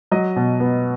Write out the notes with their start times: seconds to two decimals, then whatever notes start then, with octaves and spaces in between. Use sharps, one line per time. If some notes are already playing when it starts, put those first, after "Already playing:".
0.11 F#3 D#5
0.36 B2
0.60 B3